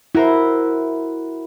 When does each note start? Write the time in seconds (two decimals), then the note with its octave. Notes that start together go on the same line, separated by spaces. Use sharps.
0.15 E4 F#4 A#4 C5